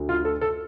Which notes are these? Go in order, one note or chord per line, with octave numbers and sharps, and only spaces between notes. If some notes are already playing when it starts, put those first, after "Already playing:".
Already playing: D2
F4
A4
A4